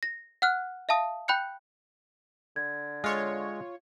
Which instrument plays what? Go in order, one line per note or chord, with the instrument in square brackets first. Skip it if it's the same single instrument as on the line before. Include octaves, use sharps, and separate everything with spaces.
[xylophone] A#6
F#5 F6 F#6
E5 F5 A5 D#6
G5 B5 F#6 G6 C#7
[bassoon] D3 [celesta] G#6
[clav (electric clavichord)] G#3 [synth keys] F4 C#5